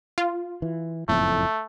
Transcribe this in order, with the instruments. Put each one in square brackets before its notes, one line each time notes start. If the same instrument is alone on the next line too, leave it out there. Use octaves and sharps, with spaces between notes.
[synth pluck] F4
[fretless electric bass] E3
[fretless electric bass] F#1 F2 A2 [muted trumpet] A3